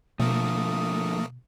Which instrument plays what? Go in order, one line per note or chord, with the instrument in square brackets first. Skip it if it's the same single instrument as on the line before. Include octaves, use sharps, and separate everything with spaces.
[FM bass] B2 [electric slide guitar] D3 F3 [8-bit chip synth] A3 A#3 [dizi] D#6